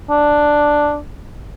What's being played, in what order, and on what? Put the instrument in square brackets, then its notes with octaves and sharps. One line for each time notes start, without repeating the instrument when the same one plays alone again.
[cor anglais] D4